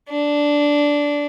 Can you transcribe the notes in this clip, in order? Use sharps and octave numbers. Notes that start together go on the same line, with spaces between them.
D4